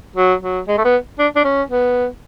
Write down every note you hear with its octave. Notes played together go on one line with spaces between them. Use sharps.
F#3
F#3
G#3
A3
B3
D4
D4
C#4
B3